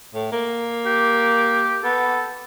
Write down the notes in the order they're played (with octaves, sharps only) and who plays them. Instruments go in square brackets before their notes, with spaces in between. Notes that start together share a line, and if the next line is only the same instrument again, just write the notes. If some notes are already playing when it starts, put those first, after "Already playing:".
[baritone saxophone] A2
A#3
[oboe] G4
[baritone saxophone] B3 [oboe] A4